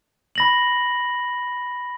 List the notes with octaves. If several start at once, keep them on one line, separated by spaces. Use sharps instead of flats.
B5 A#6 F#7